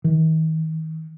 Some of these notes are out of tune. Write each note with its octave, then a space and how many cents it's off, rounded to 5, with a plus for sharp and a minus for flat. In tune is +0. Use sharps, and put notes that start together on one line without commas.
D#3 +40